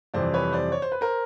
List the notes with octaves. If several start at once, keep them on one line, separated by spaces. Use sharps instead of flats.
F2 C3 E3 G3 C5 D5
B4 C#5
C5 D5
C#5
C5
B4
A#4 C5